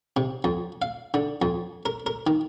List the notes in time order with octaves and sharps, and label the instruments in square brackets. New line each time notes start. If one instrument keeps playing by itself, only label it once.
[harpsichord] C3
F2
F5
D3
F2
A#4
A#4
D#3